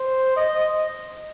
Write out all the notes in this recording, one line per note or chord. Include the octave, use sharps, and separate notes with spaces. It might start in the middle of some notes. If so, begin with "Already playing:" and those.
Already playing: C5
D#5